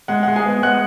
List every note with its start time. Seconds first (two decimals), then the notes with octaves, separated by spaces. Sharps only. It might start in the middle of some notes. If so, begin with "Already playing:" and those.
0.08 G#3 F#5
0.23 F#5
0.27 G#3
0.36 G#4 G#5
0.45 B3
0.62 G#3 F#5 F#6